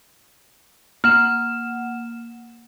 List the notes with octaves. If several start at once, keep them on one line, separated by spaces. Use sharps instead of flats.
A#3 F#5 F6 E7